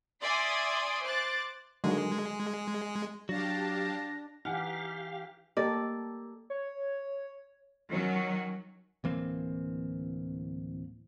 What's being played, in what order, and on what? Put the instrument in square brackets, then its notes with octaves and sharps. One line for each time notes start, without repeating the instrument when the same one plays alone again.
[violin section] D5 E5 G#5 C6 D6 D#6
C5 D6 F#6 A6
[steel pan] D3 D#3 F#3 [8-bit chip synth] G#3
[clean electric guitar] F#3 [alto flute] D4 [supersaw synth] G4 F5 A5 [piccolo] A#6
[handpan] E3 D#4 [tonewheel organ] G4 F5 [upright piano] F#5 [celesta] G#5 F6
[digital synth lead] A#3 [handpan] G4 A4 [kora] D5 [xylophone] D#5
[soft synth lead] C#5
[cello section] D#3 F#3 C#4 F#4
[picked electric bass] D1 E3 A#3 C4